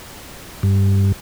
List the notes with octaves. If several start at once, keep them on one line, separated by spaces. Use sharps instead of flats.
G2